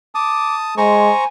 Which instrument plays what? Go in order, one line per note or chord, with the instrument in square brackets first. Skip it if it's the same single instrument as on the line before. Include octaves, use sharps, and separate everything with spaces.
[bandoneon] A5 D#6 [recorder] D6
[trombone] G#3 [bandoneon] C5 A#5 C#6 [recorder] G#5